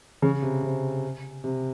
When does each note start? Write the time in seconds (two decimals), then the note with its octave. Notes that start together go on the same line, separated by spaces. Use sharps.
0.22 C#3
0.42 C3
0.63 C3
1.44 C3